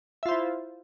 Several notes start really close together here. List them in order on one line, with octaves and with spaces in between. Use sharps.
E5 F4 C5 E4